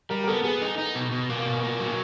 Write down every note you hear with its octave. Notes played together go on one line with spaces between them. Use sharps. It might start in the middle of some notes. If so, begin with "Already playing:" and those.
G3 A#4
A#4
B3 A4
B3 G#4
D#4
D#4
B2
B2
A#3
B2
A#3
F#3